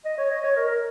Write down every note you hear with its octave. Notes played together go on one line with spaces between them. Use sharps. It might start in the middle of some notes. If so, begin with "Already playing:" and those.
D#5
C#5
D#5
C#5
A#4
A#4